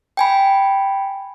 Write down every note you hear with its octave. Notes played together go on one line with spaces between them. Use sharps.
G5 G#5 B5